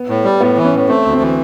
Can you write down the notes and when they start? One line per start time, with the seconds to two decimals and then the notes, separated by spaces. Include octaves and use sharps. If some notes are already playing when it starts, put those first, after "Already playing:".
Already playing: B3
0.09 A2
0.24 G3
0.40 A2 B3
0.57 E3
0.64 C#4
0.73 A2
0.88 A3 C4
1.05 D2
1.13 C4
1.21 E3